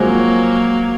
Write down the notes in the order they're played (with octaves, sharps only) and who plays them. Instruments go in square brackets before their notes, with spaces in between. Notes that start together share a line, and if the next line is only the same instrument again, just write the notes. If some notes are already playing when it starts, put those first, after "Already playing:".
Already playing: [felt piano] C3 F3 G#3 C4 F#4 [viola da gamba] F#3 A#3